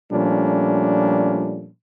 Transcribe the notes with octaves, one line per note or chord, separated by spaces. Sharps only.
A#2 F3 G3 A3 C#4 D4